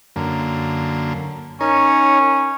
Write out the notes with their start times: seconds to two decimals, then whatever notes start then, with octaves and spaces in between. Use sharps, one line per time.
0.16 F#2 D3 A#3
1.61 C#4 D#4 A#4 C#5